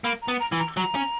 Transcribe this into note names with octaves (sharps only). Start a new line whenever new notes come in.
A#3 B5
A#5
B3
A#5
E3
A#5
F#3 A#5
C#4